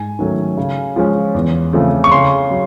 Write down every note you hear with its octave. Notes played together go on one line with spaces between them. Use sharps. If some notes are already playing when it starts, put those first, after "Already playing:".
Already playing: G#2 G#5
D#3 F#3 A3 C#4
C#3
F3 G#3 C#4
E2
C#3 F3 A3 C4
C#6
C#3 C6
F#3